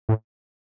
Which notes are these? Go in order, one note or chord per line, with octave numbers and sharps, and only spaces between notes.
A2